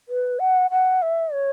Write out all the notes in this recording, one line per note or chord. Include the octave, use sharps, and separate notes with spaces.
B4
F#5
F#5
E5
C#5